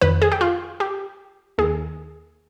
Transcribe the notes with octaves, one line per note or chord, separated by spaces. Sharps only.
F2 D#3 B4
G#4
G4
F4
G4
D#2 D#3 G#4